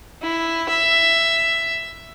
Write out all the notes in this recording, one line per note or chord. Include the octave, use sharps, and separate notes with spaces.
E4
E5